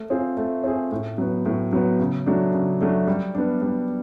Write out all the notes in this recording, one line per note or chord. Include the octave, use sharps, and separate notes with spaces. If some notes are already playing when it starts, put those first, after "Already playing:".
Already playing: A3
C4 F4 G#4
A3
C4 F4 G#4
A2
F#3 B3
A2
F#3 B3
C#3
F#3 A3 D4
C#3
F#3 A3 D4
G3
B3 D4
G3